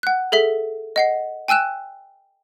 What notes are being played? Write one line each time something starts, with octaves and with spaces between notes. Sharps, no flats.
F#5 F#6
G#4 A4 E5 B6
D#5 F#5 C7
G5 G#5 E6 F#6 E7